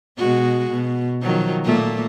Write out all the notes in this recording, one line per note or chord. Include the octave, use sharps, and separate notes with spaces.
B2 G#3 F#4
B2
D#3 F3 F#3
A#2 A3 A#3